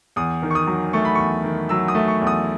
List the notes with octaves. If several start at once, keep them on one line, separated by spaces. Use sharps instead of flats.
E2 D#6
D#3
C#6
D#6
F#3
A3 C#6
B5
E2 C#6
D#3
F#3 E6
D#6
A3
C#6
E2
D#6